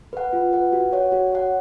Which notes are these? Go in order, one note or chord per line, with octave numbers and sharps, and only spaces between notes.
B4 F#5
F4
B4 F#5
F#4
C#5 F#5
F#4
C#5 F#5